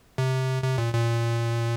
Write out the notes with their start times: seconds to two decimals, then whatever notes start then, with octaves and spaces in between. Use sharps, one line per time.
0.18 C3
0.63 C3
0.78 A#2
0.94 A#2